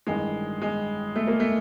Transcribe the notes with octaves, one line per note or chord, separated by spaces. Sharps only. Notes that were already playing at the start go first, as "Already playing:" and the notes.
A1 G2 D#3 G#3
G#3
A3
A#3
A3